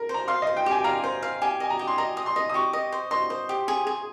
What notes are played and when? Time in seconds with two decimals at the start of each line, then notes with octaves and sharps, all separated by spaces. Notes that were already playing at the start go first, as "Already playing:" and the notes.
Already playing: A#4
0.09 C5
0.14 A#5
0.28 F5 C6
0.42 C5 D#5
0.57 G5
0.66 G4 G#5
0.84 F5 A#5
1.04 C5
1.23 F5
1.42 G4 G#5
1.60 D#5 G#5
1.70 A#5
1.79 G4
1.87 C6
1.98 D#5 A#5
2.17 D#5
2.26 C6
2.36 D#5
2.49 D#6
2.54 G4 C#6
2.73 D#5
2.92 C5
3.11 D#5 C6
3.30 C5
3.49 G4
3.68 G#4
3.87 G#4